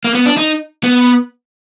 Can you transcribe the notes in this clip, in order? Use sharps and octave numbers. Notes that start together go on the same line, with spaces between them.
A#3
B3
D4
D#4
B3